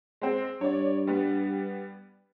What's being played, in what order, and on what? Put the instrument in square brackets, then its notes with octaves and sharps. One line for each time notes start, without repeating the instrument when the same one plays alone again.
[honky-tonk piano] G#3 C4
[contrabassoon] G2 [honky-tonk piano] C#5 D5
[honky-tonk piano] G3 B3